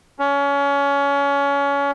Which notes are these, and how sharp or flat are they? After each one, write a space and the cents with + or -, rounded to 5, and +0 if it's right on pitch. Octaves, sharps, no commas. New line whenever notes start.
C#4 +25